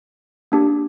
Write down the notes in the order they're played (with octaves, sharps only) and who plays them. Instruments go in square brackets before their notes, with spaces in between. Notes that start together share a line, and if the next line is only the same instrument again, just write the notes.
[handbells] A#3 D4 G4